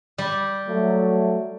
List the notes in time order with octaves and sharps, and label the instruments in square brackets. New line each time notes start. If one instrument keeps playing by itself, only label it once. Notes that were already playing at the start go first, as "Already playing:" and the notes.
[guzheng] G3
[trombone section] F#3 A3